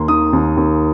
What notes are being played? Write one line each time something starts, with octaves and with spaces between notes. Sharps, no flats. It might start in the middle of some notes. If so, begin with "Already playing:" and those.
Already playing: D#2 A#3 C6
D#3 D#6
D#2
D#2